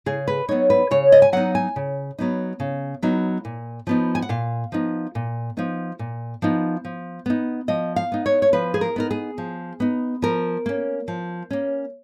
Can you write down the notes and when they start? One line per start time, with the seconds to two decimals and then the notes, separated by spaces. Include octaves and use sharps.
0.06 C#3 G#4
0.28 B4
0.49 F#3 B3 D#4 C#5
0.70 B4
0.91 C#3 C#5
1.12 D#5
1.22 G#5
1.33 F#3 B3 D#4 F#5
1.55 G#5
1.76 C#3
2.18 F#3 B3 D#4
2.60 C#3
3.03 F#3 B3 D#4
3.45 A#2
3.87 F3 B3 D#4
4.15 G#5
4.22 F#5
4.29 A#2 F5
4.72 F3 B3 D#4
5.15 A#2
5.57 F3 B3 D#4
5.99 A#2
6.42 F3 B3 D#4
6.85 F3
7.26 B3 D#4
7.68 F3 D#5
7.96 F5
8.12 B3 D#4
8.26 C#5
8.42 C#5
8.53 F3 B4
8.74 G#4
8.81 A#4
8.96 B3 D#4 A#4
9.11 G#4
9.38 F3
9.80 B3 D#4
10.22 F3 A#4
10.66 A#3 C#4
11.08 F3
11.51 A#3 C#4